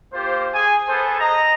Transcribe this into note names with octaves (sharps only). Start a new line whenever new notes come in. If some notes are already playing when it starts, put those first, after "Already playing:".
A#3 F4 G4 C5
G#4 G#5
B3 G#4 A4 C5 A5
D#5 A#5